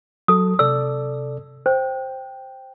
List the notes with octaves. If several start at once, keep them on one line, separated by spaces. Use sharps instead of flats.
F#3 A4 D#6
C3 A4 D5 E6
C5 G5